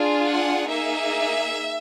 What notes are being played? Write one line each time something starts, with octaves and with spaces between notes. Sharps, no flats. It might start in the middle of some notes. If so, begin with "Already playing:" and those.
Already playing: D4 F4 G#4
F#5
A#3 D#4 G#4 E5